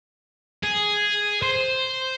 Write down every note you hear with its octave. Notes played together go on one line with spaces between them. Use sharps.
G#4
C5